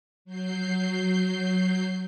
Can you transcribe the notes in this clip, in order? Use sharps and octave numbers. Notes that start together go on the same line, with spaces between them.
F#3 G6 C7